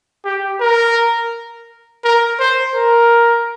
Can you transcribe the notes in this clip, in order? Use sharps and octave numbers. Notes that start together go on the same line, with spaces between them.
G4
A#4
A#4
C5
A#4